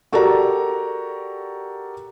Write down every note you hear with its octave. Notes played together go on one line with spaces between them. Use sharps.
F#4 G4 A4 A#4 D5 A#5